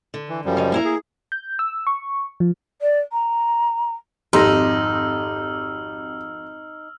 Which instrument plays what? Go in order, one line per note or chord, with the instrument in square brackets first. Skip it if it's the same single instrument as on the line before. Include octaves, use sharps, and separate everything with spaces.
[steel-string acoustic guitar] D3
[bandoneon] E3
F#2 F3 G3
[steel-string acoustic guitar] C#3 D#4
A#3 E4 A#5
[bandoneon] G#4
[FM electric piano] G6
E6
C#6
F3
[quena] D5
A#5
[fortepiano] G#1 F2 C6 [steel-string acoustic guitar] D#4 [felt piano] G4 A#6 [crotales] E6 F6